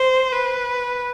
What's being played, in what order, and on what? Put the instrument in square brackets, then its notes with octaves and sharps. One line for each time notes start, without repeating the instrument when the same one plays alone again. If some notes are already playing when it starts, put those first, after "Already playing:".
Already playing: [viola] C5
B4